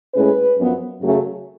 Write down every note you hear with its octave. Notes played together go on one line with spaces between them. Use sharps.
A2 G#3 C#4 B4
F#2 F3 B3
F#2 C#3 F#3 A3 C#4